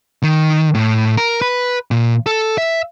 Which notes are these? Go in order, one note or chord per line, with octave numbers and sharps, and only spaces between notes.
D#3
A2
A#4
B4
A#2
A4
E5